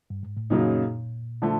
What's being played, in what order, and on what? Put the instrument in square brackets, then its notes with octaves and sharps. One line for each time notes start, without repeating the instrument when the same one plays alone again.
[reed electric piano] G2
G#2
A2
[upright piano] F#2 C#3 F#3 A#3 D#4 [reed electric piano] A#2
[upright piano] D3 F3 A3